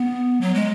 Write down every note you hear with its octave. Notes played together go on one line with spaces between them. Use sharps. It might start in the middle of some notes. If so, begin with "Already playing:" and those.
Already playing: B3
F#3
G#3